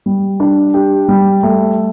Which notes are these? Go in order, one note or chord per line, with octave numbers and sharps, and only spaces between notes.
G3
D4
G4
G3
A3